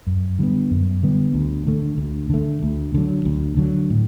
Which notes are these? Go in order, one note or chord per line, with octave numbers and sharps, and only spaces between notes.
F#2
D3 G3 B3
F#2
D3 G3 B3
D2
D3 A3
D2
D3 A3
D2
D3 F#3
D2
D3 F#3
A2